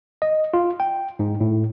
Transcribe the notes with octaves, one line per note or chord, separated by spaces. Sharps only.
D#5
F4
G5
G#2
A2